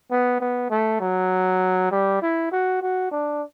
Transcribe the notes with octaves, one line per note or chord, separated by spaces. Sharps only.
B3
B3
A3
F#3
G3
E4
F#4
F#4
D4